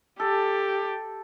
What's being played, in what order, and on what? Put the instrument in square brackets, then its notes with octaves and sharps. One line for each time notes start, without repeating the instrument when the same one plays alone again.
[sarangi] G4 [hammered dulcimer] A4